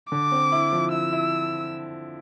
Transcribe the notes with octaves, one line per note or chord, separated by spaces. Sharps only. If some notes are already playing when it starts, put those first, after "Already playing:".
D3 D6
C4
E4
F3
E4 E6
E4